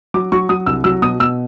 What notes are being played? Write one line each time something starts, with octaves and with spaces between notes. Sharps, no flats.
F#3 D6
F#3 C#6
F#3 D#6
C2 E6
F#3 E6
B2 D#6
B2 E6